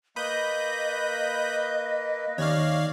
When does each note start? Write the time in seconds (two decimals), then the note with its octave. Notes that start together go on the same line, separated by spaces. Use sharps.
0.16 A#3 B4 D#5 B5 D#6 G6
2.38 D#2 C#5 D5 F5